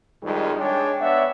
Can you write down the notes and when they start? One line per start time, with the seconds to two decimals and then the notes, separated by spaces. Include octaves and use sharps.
0.23 C2 F2 D#3 G3 G#3
0.58 G#3 D4 C#5 G5
1.00 B3 D4 C#5 E5 F#5